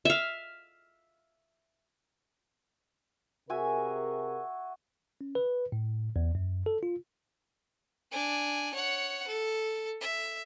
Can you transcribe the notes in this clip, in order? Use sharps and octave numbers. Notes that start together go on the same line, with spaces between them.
E5 F5
C3 F#4 G#4 A#4 E5 G#5
C#4
B4
A2
E2
F#2
A4
F4
D4 G#5
C#5 F#5
A4
E5